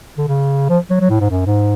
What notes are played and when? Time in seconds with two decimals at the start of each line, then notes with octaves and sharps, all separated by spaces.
0.18 D3
0.28 C#3
0.69 F3
0.90 F#3
1.00 F#3
1.10 A2
1.20 G#2
1.30 F#2
1.46 G#2